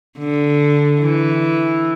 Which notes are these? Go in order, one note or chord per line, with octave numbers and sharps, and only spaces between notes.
D3
E3